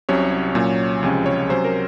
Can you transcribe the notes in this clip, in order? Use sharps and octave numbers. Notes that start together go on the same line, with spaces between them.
C2 C3 F#3 C#4 C#5
A#2 F#3 C#4
C#2 C3 F3 G#3 C#4
C#5
C3 F#3 C#4 C5
A#4